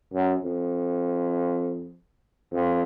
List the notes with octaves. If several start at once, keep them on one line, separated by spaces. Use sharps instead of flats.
F#2
F2
F2